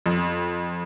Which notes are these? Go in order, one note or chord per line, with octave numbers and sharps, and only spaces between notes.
F2